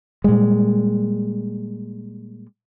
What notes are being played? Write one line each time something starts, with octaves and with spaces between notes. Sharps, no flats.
A#2 G3 G#3